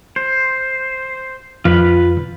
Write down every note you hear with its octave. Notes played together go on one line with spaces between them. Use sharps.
C5
F2 F4 B4 B5